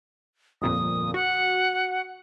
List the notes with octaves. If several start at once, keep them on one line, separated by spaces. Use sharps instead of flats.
G1 F2 A#2 D#6
F#4 F#5